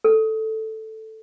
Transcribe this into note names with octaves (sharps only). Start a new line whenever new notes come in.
A4